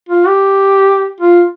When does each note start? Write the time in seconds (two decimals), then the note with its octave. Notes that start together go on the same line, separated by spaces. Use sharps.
0.09 F4
0.27 G4
1.21 F4